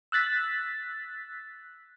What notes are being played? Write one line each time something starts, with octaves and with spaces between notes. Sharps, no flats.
E6 F#6 A6 B6